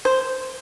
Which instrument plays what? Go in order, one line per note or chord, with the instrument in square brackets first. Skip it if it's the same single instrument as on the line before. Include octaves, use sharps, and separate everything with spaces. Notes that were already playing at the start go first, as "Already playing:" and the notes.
[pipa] C5